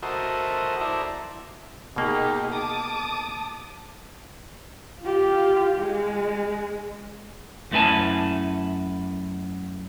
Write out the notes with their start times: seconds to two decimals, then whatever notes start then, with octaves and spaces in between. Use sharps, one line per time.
0.03 F#4 A4 A#4 C5 D#5 E5
0.81 E4 A4 C5 D5 E5 A#5
1.96 B2 A#3 D#4 G4 G#4
2.53 A5 D6 D#6
5.01 F4 G4
5.81 G#3
7.71 F#2 A3 E4 B4 G#5 A5